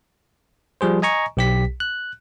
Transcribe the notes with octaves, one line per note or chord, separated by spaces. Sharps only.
F3 G3 G#4 C5
D#5 G#5 A#5 C#6
B1 G4 B6
F#6